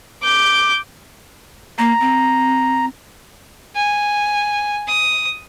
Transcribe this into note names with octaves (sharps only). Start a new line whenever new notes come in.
D6 G6
A#3 A#5
C4
G#5
D#6